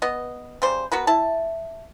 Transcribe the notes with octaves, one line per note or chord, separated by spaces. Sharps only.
B3 D#5
C#3 G3 G4 C5
B3 F#4 A#4 B4
E4 A5